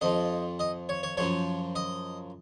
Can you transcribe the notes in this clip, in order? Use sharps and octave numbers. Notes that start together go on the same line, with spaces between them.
F2 F3 D#5
D#5
C#5
C#5
F#2 F3 C#5
D#5